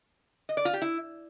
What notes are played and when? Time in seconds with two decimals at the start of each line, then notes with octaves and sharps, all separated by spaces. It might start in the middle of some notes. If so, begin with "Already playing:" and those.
0.49 D#5
0.57 D5
0.65 F4
0.73 G4
0.82 E4